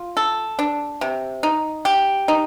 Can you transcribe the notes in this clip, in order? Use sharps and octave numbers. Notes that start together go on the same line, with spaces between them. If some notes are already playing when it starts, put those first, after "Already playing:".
Already playing: F4
A4
D4
C3
D#4
G4
D#4